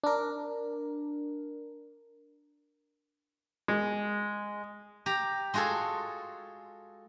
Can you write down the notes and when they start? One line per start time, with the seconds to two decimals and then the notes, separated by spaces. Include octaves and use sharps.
0.04 D4 A#4
3.68 G#3
5.06 G4 A#5
5.54 G#3 F4 F#4 G#4 A4